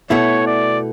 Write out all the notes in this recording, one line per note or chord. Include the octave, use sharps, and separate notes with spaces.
B2 A3 E4 C#5
D5